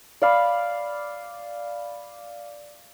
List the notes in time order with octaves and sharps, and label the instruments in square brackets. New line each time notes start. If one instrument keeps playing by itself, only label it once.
[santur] D5 F5 B5